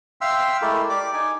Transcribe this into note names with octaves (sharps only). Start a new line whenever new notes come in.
E5 F5 G5 C6 E6
G#3 A3 E4 G4 A4 A#4
G4 D5 D6
D#4 G#5